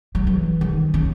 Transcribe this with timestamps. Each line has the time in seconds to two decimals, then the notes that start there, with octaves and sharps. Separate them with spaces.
0.15 F#3
0.27 E3
0.61 D#3
0.94 C#4